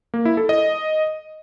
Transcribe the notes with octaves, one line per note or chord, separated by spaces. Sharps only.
A#3
E4
A4
D#5